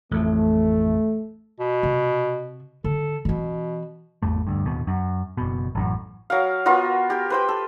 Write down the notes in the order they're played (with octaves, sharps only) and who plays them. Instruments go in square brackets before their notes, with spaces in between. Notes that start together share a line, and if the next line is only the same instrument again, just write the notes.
[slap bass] A1 F2 [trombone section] A3
[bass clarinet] B2
[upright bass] C3
[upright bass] D3 [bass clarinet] A4
[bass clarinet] B2 [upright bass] E3 C4
[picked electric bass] G#1 E2 A3
D2 G2
D1 D#2 B2
F#2
F#1 B2
A1 F#2
[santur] F#3 A#4 F5
B3 F4 F#4 A#4
G4 A#4
B4 C5 G5
A4